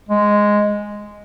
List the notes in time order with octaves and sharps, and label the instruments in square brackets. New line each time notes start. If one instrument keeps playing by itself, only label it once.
[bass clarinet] G#3